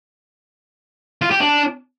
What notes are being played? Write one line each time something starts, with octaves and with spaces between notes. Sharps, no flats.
F4
G4
D4